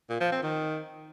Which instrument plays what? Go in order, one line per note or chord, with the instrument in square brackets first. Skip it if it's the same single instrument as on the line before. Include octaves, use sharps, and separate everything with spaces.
[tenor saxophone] A#2
F3
C4
D#3